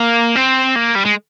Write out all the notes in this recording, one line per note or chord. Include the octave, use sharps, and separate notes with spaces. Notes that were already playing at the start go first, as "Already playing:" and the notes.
Already playing: A#3
C4
A#3
G3
G#3